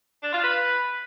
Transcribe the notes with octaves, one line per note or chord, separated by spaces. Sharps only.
D4
F4
B4